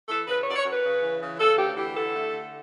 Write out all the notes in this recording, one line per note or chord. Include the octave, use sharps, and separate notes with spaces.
E3 A4
C#3 B4
F#2 C#5
D5
C#5
F#2
B4
C#3
E3
C#3
C#3 A4
D2 G4
E3 G4
D3 A4
A3
D3